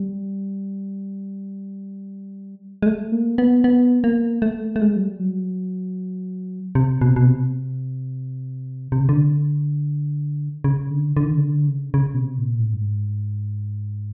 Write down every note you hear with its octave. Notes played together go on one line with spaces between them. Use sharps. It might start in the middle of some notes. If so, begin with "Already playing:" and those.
Already playing: G3
G#3
A3
A#3
B3
B3
A#3
A3
A3
G#3
F#3
G3
F#3
C3
B2
C3
B2
C3
C3
C#3
D3
C#3
D3
D3
D#3
D3
C#3
D3
C#3
C#3
B2
C3
A#2
A2
G2
G#2